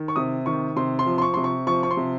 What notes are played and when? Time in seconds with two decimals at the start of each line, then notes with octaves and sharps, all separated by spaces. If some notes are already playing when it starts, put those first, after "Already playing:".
Already playing: D#3
0.08 C#6
0.16 C3 D#6
0.46 D#3 C#6
0.76 C3 C6
0.99 C6
1.06 F3
1.18 C6
1.22 C#6
1.34 C3 C6
1.44 C#6
1.67 F3 C#6
1.83 C#6
1.91 C6
1.97 C3